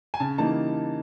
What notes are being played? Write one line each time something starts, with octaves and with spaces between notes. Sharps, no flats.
G#5
C#3 A5
E3 G3 A#3 D#4 A5